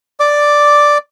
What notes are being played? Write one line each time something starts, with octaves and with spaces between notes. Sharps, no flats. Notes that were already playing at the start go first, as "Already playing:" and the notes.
D5 D6